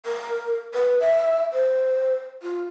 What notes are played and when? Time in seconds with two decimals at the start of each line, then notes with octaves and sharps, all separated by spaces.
0.06 A#4
0.74 B4
1.01 E5
1.53 C5
2.43 F4